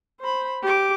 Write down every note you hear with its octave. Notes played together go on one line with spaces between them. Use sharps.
C5 B5
G4 D6